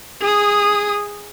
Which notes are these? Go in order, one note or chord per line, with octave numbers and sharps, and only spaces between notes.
G#4 D#6